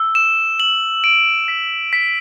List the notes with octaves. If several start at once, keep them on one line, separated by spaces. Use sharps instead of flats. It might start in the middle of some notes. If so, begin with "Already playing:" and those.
Already playing: E6
E7
F#7
D7
B6
B6